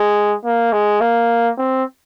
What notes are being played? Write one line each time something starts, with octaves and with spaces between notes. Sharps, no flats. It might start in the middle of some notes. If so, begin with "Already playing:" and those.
Already playing: G#3
A#3
G#3
A#3
C4